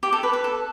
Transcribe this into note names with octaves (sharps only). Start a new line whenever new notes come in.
G4
A4
B4
B4
A4